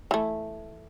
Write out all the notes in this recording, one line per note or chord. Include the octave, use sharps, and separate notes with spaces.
E3 A3